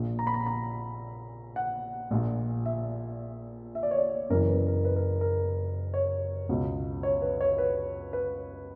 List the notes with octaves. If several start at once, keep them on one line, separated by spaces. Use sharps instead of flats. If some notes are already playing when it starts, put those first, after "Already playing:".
Already playing: A#1 A#2
A#5
B5
A#5
A#5
F#5
A#1 A#2
E5
E5
D5
C#5
D5
F#1 F#2 C#3 E3 A#4
B4
A#4
B4
A#4
A#4
C#5
C#2 B2
C#5
B4
C#5
B4
B4